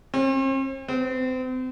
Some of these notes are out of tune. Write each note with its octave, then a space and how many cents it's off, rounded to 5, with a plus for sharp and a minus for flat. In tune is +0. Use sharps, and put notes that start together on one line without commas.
C4 +45
C4 -35